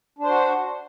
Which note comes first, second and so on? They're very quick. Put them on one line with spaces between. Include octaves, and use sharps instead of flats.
D4 C5 F#4